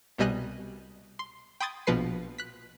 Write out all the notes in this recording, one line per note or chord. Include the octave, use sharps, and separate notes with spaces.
C2 B2 G3 D#5 G#5 F#6
C6
G5 B5 C6 D#6 G#6 A6
A#1 B2 F3 B4 C7
F#6 B6